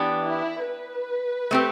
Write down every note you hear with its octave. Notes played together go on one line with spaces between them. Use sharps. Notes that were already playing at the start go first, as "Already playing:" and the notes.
Already playing: E3 B3 D4 G4
E4
B4
A3 C4 G4